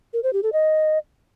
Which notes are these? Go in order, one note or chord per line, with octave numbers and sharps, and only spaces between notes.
A#4
C5
G4
A4
D#5